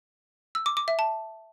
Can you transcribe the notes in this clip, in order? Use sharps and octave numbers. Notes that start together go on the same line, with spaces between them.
E6
D6
D6
E5
A5